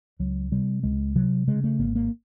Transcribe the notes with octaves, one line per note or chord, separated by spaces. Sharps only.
C#2 F#3
C3 G3
C#2 G#3
C3 F#3
C#3 G#3
A3
G#1 A#3
A#3